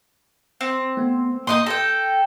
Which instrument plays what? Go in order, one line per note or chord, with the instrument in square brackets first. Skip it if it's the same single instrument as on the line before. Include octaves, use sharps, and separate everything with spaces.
[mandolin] C4
[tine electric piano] A3 B3
[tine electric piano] A2 A#3 [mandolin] D#4 D#5 C6
[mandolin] A4 G5 [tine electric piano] A#6